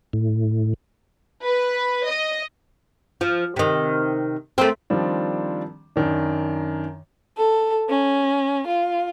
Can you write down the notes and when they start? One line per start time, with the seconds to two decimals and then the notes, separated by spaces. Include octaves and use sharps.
0.13 A2
1.44 B4
2.09 D#5
3.21 F3
3.56 C3 D#3
4.58 A3 A#3 C4
4.90 D#3 F3 G3 C4 D4
5.96 F#2 D#3 D4
7.38 A4
7.90 C#4
8.66 F4